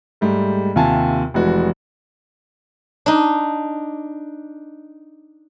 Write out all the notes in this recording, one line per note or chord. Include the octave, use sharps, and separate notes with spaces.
G#2 G3 A3
D#2 C3 F4 E5 G#5 A5
F1 E3 G#3 F#4
D4 D#4